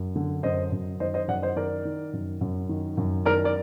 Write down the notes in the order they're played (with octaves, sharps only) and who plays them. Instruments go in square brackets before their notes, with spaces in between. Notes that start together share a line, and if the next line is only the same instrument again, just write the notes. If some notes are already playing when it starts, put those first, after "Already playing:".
Already playing: [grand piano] F#2
D3
F#2 C5 D#5
F#2
D#3 C5 D#5
C5 D#5
F#2 D5 F#5
C5 D#5
D#3 A#4 D5
D#3
F#2
F#2
D#3
F#2
D#3 A#4 D5
A#4 D5